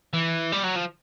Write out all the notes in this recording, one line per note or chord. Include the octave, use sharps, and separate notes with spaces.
E3
G3
F#3
F3